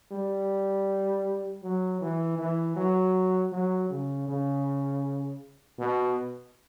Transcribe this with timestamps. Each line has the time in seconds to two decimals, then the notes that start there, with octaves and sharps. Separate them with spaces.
0.11 G3
1.63 F#3
2.01 E3
2.38 E3
2.76 F#3
3.52 F#3
3.90 C#3
4.28 C#3
5.79 B2